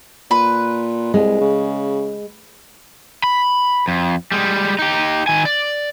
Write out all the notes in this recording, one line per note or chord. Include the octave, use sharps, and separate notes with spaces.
A#2 B4
C2 G#3
C#3
B5
F2
G3 G#3
D#4 G4
D#3 G#5
D5